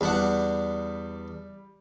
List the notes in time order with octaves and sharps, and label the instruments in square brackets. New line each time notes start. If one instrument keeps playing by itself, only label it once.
[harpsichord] E2 D4 F#5 [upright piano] G3